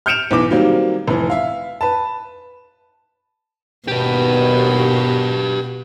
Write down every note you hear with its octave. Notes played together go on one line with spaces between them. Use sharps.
F6 G6 C#7 D7 E7 F7
B1 E3 D6
D#3 F#3 G3 A#3 C4
F1 E3
E5 F5
B4 A5
D#2 B2 B3 G4 B4